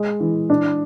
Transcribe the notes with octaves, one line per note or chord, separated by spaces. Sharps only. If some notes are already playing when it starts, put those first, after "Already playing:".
Already playing: G#3
E3
D4